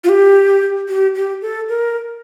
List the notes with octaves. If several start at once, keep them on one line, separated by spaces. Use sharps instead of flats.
F4
G4
G4
G4
A4
A#4